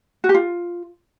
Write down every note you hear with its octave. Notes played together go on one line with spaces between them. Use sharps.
F#4
G4
F4